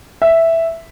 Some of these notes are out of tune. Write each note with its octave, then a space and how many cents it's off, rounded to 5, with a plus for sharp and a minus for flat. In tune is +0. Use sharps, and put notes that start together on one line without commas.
E5 +0